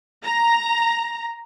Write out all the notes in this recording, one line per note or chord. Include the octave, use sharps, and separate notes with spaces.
A#5